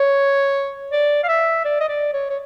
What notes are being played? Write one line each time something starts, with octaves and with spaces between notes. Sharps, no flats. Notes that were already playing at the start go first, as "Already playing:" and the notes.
Already playing: C#5
D5
F5
E5
D5
D#5
D5
C#5
C#5